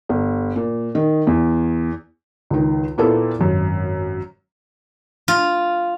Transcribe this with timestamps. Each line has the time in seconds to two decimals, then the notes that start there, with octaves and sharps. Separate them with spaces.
0.09 G1
0.56 A#2
0.95 D#3
1.27 E2
2.50 C#2 D#3
2.98 A#2 A#3 B3 E4 A4
3.39 G#1 F#2
5.28 F4